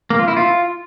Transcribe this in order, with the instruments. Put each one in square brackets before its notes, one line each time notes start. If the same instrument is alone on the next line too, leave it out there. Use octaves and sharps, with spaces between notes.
[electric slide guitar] A#3
F4
E4
F4